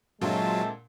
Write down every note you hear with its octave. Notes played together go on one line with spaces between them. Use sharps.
A#2 D3 F#3 G#3 C4 F4 E5 A5